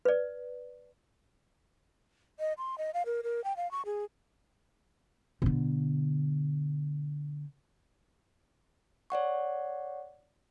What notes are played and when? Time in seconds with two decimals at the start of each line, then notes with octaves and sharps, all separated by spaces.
0.05 B4 D5
2.40 D#5
2.58 C6
2.78 D#5
2.94 F5
3.06 A#4
3.23 A#4
3.44 G5
3.57 F5
3.71 C#6
3.86 G#4
5.42 B2 D3
9.10 C#5 D5 F#5 C#6